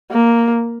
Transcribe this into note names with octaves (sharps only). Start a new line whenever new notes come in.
A#3